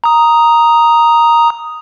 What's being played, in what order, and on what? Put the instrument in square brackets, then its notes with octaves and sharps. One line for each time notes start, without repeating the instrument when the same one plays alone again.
[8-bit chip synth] A#5 D#6